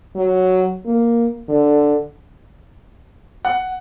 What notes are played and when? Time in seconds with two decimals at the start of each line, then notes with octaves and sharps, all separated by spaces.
0.16 F#3
0.86 A#3
1.49 D3
3.45 F#5